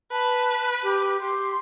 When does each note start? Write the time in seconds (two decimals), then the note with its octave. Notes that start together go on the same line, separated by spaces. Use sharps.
0.12 B4 A5
0.83 G4
1.21 G4 C6